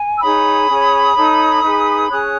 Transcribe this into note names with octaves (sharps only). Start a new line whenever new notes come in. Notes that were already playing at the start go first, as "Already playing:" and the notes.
Already playing: G#5
E6
D#4 G#4 C#5 B5 D#6
C#4 G#4 C#5
D#4 A4 C#5
D#4 G#4 B4
C#4 G#4 C#5 D#6 F#6